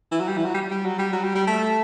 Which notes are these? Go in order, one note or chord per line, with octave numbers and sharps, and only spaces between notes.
E3
F#3
G3
E3
F#3
G3
G3
F#3
G3
F#3
G3
G3
A3